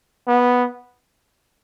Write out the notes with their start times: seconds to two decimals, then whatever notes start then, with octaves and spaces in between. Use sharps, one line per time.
0.27 B3